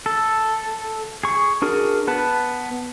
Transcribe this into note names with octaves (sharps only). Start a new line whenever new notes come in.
A4
G#4 C#6
D4 F#4 G#4 A#4
B3 B4 A5